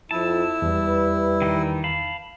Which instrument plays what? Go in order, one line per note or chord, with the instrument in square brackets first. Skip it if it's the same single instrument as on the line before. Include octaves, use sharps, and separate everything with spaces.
[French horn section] F2 [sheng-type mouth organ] E4 [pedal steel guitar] A5
[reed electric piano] E2 [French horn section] G3 B4
[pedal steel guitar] D#3 E3 D#4
F5 A5 B5